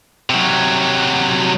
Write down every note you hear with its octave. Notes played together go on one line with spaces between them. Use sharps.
C3 F#3